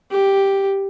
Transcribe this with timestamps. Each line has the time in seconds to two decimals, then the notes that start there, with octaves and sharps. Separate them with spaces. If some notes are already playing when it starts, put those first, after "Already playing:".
0.11 G4